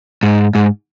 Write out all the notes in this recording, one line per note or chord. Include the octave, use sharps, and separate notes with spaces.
G#2
G#2